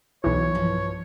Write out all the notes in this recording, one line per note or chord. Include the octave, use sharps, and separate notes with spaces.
B1 E3 C#5
G2 F3